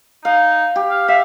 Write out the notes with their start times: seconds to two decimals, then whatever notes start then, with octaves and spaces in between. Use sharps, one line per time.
0.25 D#4 F5
0.76 G4
0.90 F5
1.08 E5 F5